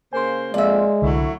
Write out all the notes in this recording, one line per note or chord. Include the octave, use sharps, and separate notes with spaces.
C#3 A#3 C5 G#5 C6
F2 G#3 A#3 D5 E5
C2 D3 F#3 A3 E4